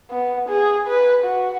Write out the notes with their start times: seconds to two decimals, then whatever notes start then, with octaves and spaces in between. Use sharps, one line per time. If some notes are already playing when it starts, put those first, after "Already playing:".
0.11 B3
0.49 G#4
0.87 B4
1.25 F#4